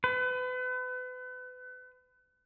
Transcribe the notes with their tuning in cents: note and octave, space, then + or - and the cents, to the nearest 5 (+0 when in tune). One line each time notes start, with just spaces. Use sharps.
B4 +35